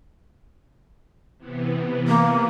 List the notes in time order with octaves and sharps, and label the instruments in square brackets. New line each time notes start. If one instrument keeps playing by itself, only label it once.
[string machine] C3 E3 B3
[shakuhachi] A#3